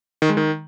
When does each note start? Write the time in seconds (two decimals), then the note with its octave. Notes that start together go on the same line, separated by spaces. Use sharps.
0.22 D#3
0.29 G#3
0.37 D#3